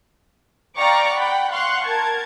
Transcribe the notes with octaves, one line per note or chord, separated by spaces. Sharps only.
D5 F5 G5 A#5 C#6 D6
F#5 G5 B5
F5 F#5 C6 C#6 F#6
A#4 A5 G#6